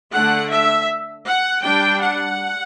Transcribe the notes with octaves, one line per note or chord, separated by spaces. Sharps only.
D3 A3 D4 F#5
E5
F#5
G3 D4 G5
F#5